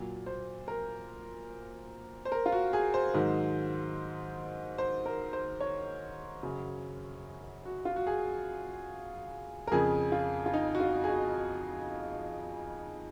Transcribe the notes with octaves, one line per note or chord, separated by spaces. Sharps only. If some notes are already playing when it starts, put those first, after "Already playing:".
Already playing: A#2 F#3
C5
A#4
C5
A#4
F4
F#4
G#4
C5
G#2 D#3 F#3
C5
A#4
C5
C#5
F#2 C#3 F#3
F#4
F4
F#4
G#4
A#4
F2 C#3 F3 G#4
F4
F4
D#4
F#4
F4
G#4
F#4